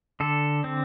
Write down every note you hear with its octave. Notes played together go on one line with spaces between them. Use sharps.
D3 A4
C4